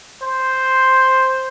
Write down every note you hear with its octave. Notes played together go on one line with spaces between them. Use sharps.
C5